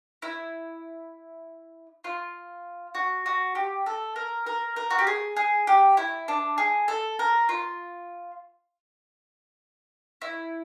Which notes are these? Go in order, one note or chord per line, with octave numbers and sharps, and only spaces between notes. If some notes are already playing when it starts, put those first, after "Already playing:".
E4
F4
F#4
F#4
G4
A4
A#4
A#4
A#4
F#4
G4
G#4
G#4
G4
E4
D4
G#4
A4
A#4
F4
E4